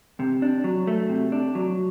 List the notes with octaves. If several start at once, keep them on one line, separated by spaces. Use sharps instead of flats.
C3
D4
F#3
A3
C3
D4
F#3